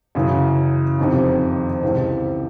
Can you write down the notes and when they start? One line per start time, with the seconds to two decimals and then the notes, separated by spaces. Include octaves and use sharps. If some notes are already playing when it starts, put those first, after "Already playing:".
0.15 F#2 C#3 E3
0.99 F2 C3 D#3
1.83 C#2 C3 E3